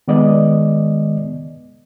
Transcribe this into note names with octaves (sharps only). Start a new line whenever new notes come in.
D#3 G#3 B3 D5 D#5